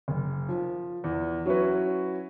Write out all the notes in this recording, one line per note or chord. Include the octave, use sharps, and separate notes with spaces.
F#1
F3
E2
F#3 C#4 E4 F#4 B4